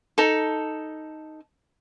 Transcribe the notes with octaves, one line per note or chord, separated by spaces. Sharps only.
D#4 A4